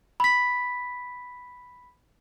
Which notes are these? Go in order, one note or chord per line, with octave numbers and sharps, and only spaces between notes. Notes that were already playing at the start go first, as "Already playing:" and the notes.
B5 B6